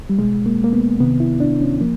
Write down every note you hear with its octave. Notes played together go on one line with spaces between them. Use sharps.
G3
B2 G#3
A#3
A#3
B3
C3 D#3 B3
E4
D4
C#4
F3 A#3